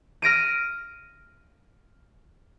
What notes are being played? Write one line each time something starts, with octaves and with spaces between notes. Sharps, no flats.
F6 A#6 D7 D#7